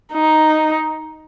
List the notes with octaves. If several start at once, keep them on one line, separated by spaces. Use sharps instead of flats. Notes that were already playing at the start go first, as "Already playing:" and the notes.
D#4